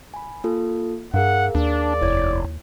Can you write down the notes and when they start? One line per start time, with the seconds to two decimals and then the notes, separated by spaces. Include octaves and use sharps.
0.14 G#5 B5
0.44 A#3 F4 A4
1.14 G2 G#4 A#4 F5 F#5
1.55 D#2 D4 D5
2.02 F1 E4 C#5 G#6